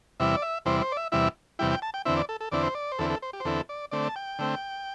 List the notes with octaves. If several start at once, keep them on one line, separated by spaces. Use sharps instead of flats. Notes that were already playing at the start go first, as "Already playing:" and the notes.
E2 C3 G3 E4 E5
D5
E5
E2 C3 G3 E4 C5
C5
D5
E5
E2 C3 G3 E4 E5
E2 C3 G3 E4 G5
G5
A5
G5
E2 D3 C4 E4 E5
D5
A4
A4
E2 D3 C4 E4 D5
C5
D5
C5
E2 D3 C4 E4 A4
A4
C5
G4
C5
E2 D3 C4 E4 A4
D5
D3 A3 C4 D5
A5
G5
D3 A3 C4